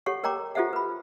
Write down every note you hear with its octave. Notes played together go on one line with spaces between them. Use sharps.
G4 A4 C#5 F#5 C#6
A#4 C#5 G5 A#5 D6
F4 G4 A4 C5 E5 F#5
B4 B5